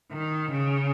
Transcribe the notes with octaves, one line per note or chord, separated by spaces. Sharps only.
D#3
C#3